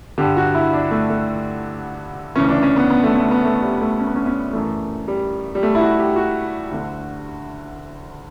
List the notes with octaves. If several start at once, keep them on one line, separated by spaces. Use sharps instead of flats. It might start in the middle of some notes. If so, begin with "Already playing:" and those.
G2 D3 G4
F#4
E4
D4
A3
A3
D2 C#3 E3 C#4
D4
C#4
B3
B3
A3
A3
B3
A3
G3
A3
C#4
B3
C#4
C#4
F#2 E3 A3
G3
G3
A3
E4
F#4
G4
F#4
D2 D3